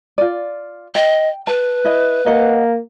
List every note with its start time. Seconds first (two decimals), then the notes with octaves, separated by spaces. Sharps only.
0.18 F4 D5
0.95 D#5 G5
1.47 B4 A5
1.85 E4 D#5
2.26 A#3 D#5 F#5